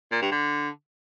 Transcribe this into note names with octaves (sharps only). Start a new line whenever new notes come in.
A#2
G2
D3